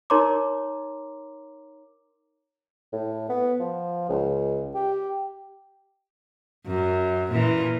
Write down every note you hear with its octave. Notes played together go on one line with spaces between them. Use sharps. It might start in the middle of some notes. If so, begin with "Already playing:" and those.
D#4 A#4 C#5 A#5 C6 D6
A2
B3
F3
C#2
G4
F#2
A#2 E3